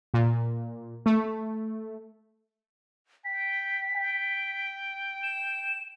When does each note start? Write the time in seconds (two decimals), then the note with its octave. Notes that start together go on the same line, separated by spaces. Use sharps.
0.14 A#2
1.06 A3
3.25 G5 B6
3.95 G5
5.23 E7